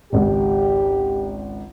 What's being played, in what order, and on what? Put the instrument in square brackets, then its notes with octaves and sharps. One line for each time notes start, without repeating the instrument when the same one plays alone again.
[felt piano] G#1 C#2 [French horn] G4